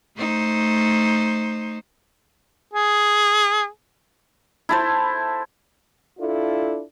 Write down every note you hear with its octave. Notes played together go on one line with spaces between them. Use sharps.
A3 D#4 C5
G#4
E4 A4 C5
D4 E4 F4 A4